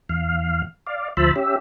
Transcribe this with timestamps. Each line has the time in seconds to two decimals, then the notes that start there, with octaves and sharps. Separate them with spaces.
0.09 E2 F5
0.87 D5 F5
1.17 D2 F3 C5 E5 A5 B5
1.36 C#4 G4 E5